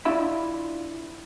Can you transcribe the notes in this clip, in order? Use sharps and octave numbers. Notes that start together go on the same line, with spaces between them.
D4 E4 F4 E5 B5